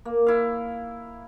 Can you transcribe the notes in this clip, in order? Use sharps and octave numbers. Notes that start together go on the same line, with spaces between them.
A#3
E4 F5